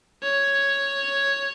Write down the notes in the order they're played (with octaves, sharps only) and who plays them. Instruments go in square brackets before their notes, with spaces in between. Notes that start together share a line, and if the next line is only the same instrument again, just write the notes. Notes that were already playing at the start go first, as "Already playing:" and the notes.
[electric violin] C#5